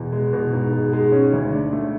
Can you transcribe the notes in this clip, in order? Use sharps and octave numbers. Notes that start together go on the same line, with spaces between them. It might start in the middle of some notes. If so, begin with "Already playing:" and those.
Already playing: E2 B2
G#3
B2
G#2
G#3
G#3
C#4
D2
D4
A3